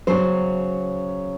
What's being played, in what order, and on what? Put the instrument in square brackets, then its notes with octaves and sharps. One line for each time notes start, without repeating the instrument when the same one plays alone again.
[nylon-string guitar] C#3 F#3 C5